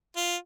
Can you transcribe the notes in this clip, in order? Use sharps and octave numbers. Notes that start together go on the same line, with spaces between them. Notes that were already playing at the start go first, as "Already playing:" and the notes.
F4